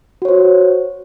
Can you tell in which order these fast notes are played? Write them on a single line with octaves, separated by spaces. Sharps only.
F#4 C#5 C5